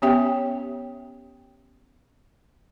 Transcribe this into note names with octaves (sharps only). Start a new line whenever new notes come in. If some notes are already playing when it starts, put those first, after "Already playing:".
B3 C#4 G4 C#5 E5 G5